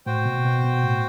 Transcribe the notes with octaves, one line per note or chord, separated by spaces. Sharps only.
A2 F#4 C5 G5
B2
B2
B2
A2